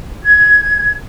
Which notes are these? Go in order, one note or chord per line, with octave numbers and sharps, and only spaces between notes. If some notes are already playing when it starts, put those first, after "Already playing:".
G#6